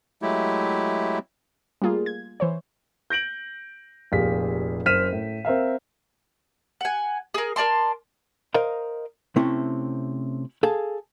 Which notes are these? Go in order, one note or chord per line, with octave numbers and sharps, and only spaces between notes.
F#3 G#3 A3 E4 G4
G3 A3 A#3 F4 G#4
G#6
E3 C5 C#5
G6 A#6 D7 F#7
F1 A#2 G4 G#4 F5 B6
F#1 C5 F6 B6 D#7 E7
A2
C4 A#4 E5 F5
F#5 G#5
G#4 A#4
A#4 D5 A5 C6
A#4 C5 D#5 F5 A#5
C3 A3 C4 C#4 E4
G#4 A4 F5 A5